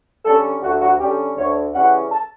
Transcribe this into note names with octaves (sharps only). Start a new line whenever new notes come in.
D3 G3 C#4 A4
D2 F#4
F#4
D3 G3 C#4 G4
D2 C#5
C#3 E3 G3 C#4 F#5
A5